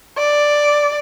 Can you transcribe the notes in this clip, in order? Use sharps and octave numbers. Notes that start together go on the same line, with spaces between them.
D5